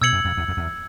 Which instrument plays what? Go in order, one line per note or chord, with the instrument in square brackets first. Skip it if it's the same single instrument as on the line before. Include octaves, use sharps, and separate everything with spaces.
[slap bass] B2 [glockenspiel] E6 G#6 C#7 F#7
[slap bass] F#2
F2
E2
F2
E2